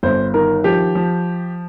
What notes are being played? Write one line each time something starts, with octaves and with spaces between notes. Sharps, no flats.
G1 C5
D#3 A#4
F3 G4
F3